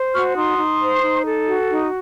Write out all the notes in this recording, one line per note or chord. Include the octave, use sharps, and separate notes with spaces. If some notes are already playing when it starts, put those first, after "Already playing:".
Already playing: C5
F#4 C#6 F6
D#4 C6 D#6
D#4
C5
D#4
A4
F#4
D#4